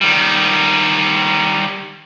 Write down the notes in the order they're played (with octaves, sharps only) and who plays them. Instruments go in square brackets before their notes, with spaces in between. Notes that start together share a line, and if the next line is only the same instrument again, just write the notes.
[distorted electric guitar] D#3 G3